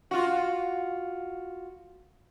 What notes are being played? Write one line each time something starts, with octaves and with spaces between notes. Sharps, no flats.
F4 F#4